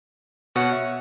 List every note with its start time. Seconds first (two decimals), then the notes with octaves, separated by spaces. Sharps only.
0.56 B2 F#4 C#5 F#5
0.72 E5